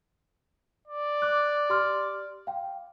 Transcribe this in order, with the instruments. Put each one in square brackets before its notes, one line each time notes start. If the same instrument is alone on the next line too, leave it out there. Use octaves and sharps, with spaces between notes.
[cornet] D5
[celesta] D6 F#6
G4 C6 F6
F5 G5